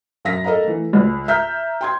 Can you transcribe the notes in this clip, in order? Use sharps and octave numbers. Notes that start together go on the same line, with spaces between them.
F#2 F5 A#6 B6
A4 A#4 D#5 F5 A#5
E3 A3
C#2
E5 A#5 F6 G6 B6
G5 C6 G#6